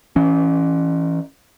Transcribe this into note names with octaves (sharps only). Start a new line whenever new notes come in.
E3 C#4